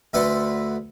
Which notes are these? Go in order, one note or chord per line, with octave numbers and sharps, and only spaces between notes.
D2 E4 B4 D5 F#5 C6